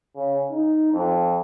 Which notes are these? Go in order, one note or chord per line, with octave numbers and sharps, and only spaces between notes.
C#3
D#4
F2